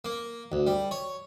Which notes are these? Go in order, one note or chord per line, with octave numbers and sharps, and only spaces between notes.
A#3
D2
G3
C#5